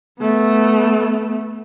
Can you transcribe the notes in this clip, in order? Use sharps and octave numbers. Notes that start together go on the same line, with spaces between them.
A3 B3